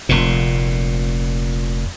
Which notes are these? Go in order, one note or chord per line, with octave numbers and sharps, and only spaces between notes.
F1 A#2